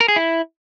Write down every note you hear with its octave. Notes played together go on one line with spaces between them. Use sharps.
A#4
G#4
E4